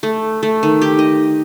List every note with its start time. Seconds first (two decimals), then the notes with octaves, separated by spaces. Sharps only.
0.03 A3
0.43 A3
0.63 D#3
0.81 G4
0.99 D#5